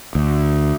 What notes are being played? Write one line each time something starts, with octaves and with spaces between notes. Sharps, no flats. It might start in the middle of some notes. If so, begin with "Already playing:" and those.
D2